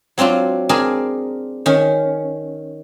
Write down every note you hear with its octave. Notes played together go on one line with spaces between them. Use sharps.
F#3 C4 D4 F4 F#4
C4 D4 G#4 A#4 G#5
D#3 C#4